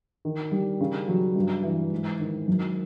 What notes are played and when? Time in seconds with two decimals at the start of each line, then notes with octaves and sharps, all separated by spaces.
0.25 D#3
0.52 G3
0.80 C#3
1.08 F#3
1.36 G2
1.63 E3
1.92 G#2
2.19 D#3
2.48 F#2